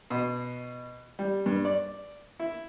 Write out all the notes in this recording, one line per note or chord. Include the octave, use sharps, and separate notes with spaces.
B2
G3
G2
D5
E4